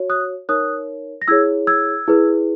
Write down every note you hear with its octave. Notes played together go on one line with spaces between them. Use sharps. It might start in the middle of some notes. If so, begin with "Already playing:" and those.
Already playing: F#4 C#5
D#6 F#6
D#4 A#4 C#5 D#6 F#6
A#6
E4 G#4 C#5 E6 G#6
E6 G#6
E4 G#4 B4